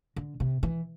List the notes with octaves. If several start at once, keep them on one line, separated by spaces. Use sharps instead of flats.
D3
C3
E3